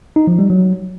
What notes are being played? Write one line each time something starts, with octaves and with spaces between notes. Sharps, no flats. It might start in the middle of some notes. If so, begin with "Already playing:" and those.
D#4
F3
G3
F#3